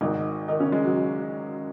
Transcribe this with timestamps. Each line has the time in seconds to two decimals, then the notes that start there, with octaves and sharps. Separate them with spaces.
0.01 G#1 G#2 D#3 D#4
0.48 D#3 D#4
0.60 C#3 C#4
0.72 G#3
0.84 F#3